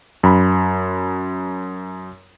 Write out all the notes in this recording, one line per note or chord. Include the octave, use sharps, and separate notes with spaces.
F#2 B5